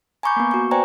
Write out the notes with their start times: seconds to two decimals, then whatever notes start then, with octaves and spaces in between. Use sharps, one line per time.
0.23 G#5 A#5 B5 C#6 D6 G6
0.36 A#3 B3
0.51 F#4 C#6
0.71 B4 C5 D5 G5 G#5 A#5